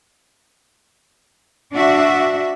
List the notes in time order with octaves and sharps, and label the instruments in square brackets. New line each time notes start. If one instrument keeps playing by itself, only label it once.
[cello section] D4 F#4 E5